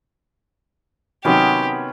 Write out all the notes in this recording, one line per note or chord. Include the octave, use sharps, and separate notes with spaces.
C3 D#3 F#3 B3 C#4 G4